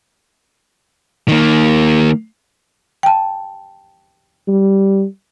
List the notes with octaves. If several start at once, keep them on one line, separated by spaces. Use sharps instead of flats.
D#3 A#3
G5 A5
G3